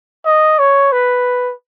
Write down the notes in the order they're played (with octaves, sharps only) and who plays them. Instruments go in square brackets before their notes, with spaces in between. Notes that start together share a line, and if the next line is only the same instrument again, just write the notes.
[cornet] D#5
C#5
B4